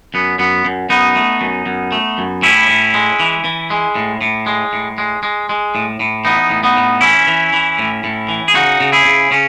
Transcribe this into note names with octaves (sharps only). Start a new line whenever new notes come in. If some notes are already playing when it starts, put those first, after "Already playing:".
F#2 B3
F#2 B3
F#2
F#2 B3 D#4
A3
F#2
F#2
A3
F#2
A2 C#4 E4
A2
G#3
E3
E3
G#3
A2
A2
G#3
A2
G#3
G#3
G#3
A2
A2
E3 B3 D#4
A2
B3 D#4
A2
E3 C#4 E4
E3
E3
A2
A2
E3
G#4
C#3 D#4 F#4
C#3
E4 G#4
C#3
C#3 C#4